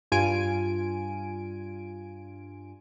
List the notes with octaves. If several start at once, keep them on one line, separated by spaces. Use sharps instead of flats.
G2 F4 G#5 D7